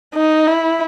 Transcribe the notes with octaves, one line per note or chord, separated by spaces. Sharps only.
D#4
E4